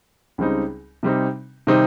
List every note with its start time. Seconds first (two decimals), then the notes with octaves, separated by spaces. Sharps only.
0.38 C#2 C#3 G3 C4 D#4
1.03 C3 G3 C4 D#4
1.67 C3 D#3 G3 C4 D#4